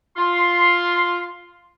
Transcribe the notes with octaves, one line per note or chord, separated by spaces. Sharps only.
F4 C6